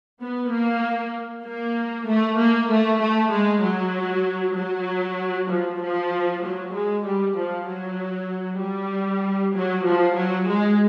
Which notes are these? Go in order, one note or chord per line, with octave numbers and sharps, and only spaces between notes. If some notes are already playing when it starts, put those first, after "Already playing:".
B3
A#3
A#3
A3
A#3
A3
A3
G#3
F#3
F#3
F3
F3
F#3
G#3
G3
F3
F#3
G3
F#3
F3
F#3
G#3